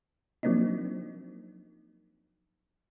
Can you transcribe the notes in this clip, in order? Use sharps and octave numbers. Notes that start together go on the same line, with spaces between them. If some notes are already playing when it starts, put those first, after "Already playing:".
F3 F#3 A#3 C4 D4 D#4